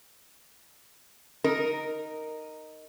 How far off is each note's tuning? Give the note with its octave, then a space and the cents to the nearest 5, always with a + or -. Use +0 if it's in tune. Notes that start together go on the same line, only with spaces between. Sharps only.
D#4 -5 A#4 -5